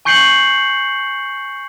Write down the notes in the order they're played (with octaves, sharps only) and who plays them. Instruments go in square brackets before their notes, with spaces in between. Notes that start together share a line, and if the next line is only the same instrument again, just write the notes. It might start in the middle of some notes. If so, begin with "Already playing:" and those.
[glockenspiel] G#5 C#6 G6 C7 C#7 F#7